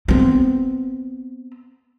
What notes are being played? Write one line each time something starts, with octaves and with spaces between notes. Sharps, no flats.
B3 C4